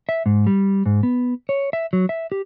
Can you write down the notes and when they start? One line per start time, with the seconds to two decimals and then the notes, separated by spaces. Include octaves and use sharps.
0.09 E5
0.26 G#2
0.47 G3
0.86 G#2
1.03 B3
1.49 C#5
1.73 E5
1.93 F#3
2.09 E5
2.32 G4